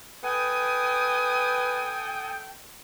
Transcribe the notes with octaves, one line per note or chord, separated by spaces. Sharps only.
A4 B4 G5 G#5 D#6